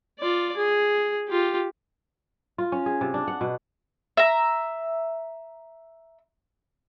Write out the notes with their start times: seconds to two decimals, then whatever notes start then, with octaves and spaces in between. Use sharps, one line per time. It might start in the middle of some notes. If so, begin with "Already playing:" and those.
0.20 F4 D5
0.57 G#4
1.29 F4 G4
2.58 F4
2.72 C#4
2.86 G#4
3.01 C3
3.14 D4
3.28 F#5
3.41 B2
4.17 E5 A#5